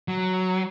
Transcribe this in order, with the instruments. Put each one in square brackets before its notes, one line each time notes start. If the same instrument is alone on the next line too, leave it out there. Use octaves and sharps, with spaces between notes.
[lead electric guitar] F#3